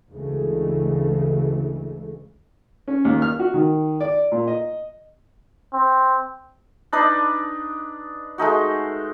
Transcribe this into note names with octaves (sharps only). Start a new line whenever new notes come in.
D2 C#3 E3 G#3 A3
C#4
D#2
F6
F#4
D#3
D5
A#2
D#5
C4
D4 D#4 B4 D5
G#3 A3 D#4 F#4